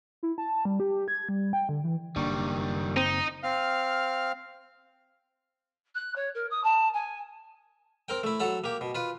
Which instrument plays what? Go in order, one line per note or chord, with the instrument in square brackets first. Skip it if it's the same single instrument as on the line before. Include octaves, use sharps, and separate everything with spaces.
[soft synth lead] E4
A5
G3
G4
G#6
G3
G5
D3
E3
[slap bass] F#1 A#3 [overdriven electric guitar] D#3 G3 [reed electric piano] D4 C#6
[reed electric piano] C4 [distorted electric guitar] D#4
[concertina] C4 F5 F6
[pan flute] F#6
C#5
A#4
D#6
A5
G#5
[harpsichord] C4 A#4 G5
A3 E4
F#3 A4 F#5 B5
A#3 G4
B2
F4 B4